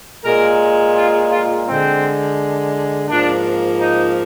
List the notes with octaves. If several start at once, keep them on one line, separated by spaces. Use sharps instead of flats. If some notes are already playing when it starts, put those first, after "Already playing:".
A#2 G#3 A#4
F4
F4
D3 G#3 C4
G#2 F3 A#3 D4
D#4